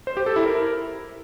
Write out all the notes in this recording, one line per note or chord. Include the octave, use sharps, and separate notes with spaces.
C5
G4
A4
E4
A#4